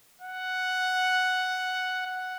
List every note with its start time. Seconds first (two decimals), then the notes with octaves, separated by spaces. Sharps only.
0.21 F#5
2.06 F#5